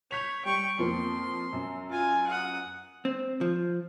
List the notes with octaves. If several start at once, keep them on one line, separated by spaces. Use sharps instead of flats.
C#5 G6 B6 F7
G3 G5 C#6
F2 F3 A#3 C6
F#2
F4 G#5
F#5 D#6
C4
F3